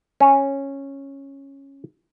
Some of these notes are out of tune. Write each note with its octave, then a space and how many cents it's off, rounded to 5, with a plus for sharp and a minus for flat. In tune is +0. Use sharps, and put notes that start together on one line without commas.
C#4 -10